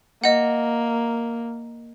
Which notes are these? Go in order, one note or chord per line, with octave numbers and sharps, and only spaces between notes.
A#3 D#5 F#5